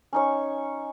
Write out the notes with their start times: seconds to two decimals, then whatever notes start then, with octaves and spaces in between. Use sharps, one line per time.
0.13 C#4 D#4 C#5